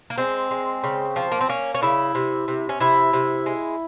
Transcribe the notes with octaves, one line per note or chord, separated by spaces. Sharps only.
A#3
G#3 C4
G#3
C#3
F3
A#3
C4
A#3 C#4
C#4
C#3 E4
C3
C3
C#4
C3 E4
C3
G#3